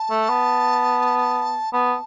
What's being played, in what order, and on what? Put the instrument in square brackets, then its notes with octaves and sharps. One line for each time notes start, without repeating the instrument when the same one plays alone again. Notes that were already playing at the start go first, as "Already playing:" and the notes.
Already playing: [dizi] A5
[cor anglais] A3
B3
[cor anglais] B3 [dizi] A5